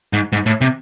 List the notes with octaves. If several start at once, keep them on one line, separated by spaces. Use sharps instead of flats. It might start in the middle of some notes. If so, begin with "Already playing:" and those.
G#2
G#2
A2
C3